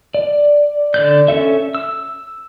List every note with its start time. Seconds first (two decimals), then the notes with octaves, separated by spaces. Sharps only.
0.14 D5
0.94 D3 D5 G6
1.28 C#4 F4 A4 E5
1.75 E6